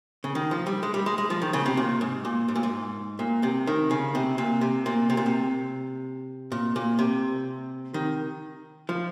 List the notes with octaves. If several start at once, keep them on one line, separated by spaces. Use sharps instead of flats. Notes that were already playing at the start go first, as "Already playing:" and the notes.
C#3
D#3
F3
G3
G#3
G3
G#3
G#3
F3
D#3
C#3
C3
A#2
G#2
A#2
G#2
A#2
G#2
A#2
C3
D#3
C#3
C3
A#2
C3
A#2
C3
A#2
C3
A#2
A#2
C3
D#3
F3